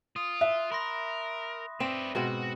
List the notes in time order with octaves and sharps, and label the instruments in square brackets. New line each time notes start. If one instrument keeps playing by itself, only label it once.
[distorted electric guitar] F4 [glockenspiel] D#6
[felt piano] E5 [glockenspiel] F#6
[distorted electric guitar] A#4 [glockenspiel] B5 C6 A#6
[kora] C4 [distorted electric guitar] B4 D5 [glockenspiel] E7
[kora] G#2 B2 C4 [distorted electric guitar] F#4